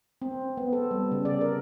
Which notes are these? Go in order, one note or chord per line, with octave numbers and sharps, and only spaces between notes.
C4
B3
A4
G3
C#3
D5
A#4